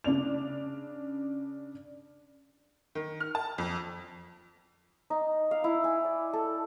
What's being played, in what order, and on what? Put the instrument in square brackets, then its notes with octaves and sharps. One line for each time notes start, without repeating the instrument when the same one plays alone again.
[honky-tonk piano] C#3 D4 D5 F7
D#3
F6
A5
F2
[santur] D#4
F5
E4
G#5
D5
A4